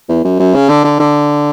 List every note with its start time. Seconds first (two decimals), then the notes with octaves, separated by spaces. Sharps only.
0.09 E2
0.24 F#2
0.39 F#2
0.55 C#3
0.69 D3
0.84 D3
1.00 D3